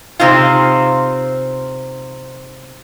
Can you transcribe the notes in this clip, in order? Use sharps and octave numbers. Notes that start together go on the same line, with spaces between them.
C3 C4 D#4 F4